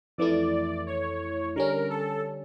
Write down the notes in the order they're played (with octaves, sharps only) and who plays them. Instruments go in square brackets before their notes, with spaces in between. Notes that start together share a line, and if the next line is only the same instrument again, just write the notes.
[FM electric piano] F2 E3 A3 E4 [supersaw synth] D5
[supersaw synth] C#5
[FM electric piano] D3 G3 C#4 [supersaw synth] A#4
[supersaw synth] A4